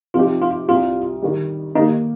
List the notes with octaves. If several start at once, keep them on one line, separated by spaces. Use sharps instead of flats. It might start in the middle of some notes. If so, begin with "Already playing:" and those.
C3 F3 D#4 F4 G4
F4
C2 C3 G3 F4
D#3 G3 D#4
D#3 A#3 D#4 G4